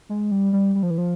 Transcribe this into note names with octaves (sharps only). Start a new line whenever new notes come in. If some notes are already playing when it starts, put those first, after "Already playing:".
G#3
G3
G3
G3
F3
E3
F3